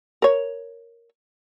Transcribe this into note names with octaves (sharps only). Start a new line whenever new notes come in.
A#4 C#5